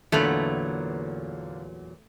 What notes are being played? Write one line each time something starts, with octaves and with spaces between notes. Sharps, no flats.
E2 A#2 D3 F#3 A3 A#3 B4 F7